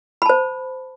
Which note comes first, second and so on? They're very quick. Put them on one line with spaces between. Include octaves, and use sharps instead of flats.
B5 A5 C5